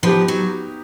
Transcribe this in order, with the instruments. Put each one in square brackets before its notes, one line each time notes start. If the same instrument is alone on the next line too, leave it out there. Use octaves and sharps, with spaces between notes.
[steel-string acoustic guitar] F3 [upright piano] B3 D#4 G4
[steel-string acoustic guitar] F#3